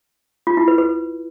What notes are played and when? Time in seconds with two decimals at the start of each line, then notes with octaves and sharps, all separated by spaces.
0.47 F4
0.57 E4
0.68 B4
0.78 B4